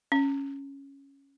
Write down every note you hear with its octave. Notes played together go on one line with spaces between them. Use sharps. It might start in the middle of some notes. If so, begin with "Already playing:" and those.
C#4